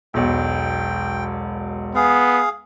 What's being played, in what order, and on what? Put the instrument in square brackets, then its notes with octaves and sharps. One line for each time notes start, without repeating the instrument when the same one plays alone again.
[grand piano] E1 B1 [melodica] G5
[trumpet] B3 [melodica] G#4 F5